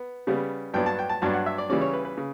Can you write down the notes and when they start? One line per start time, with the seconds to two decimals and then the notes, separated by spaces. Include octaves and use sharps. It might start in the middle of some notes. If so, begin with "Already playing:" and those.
Already playing: B3
0.27 C#3 G3 B3
0.74 G2 F#3 B3 D4 G5
0.86 A5
0.99 G5
1.09 A5
1.22 G2 F#3 B3 D4 A5
1.34 F#5
1.46 E5
1.58 D5
1.69 C#3 E3 G3 C#4 D5
1.81 C#5
1.93 B4
2.05 B4
2.17 C#3